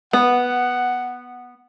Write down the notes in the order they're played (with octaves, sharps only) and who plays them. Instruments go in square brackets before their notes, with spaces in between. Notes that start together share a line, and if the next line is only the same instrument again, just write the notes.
[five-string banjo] B3 [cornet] F#5